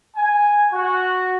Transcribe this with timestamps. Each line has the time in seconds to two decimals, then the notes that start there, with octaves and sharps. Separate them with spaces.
0.17 G#5
0.72 F#4